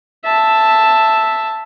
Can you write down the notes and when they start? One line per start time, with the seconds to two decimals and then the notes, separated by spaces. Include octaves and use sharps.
0.25 E5 A5